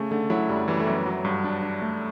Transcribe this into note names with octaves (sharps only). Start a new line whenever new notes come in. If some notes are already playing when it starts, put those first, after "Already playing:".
Already playing: C#3 A3
D3 A3
F#3 E4
F#2 G3
E3 G3
A3
F#2 B3
F#3
G2
D4
D4
A3